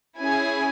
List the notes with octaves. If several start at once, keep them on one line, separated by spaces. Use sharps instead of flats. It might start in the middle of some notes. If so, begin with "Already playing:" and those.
C#4 E4 G#4 G#5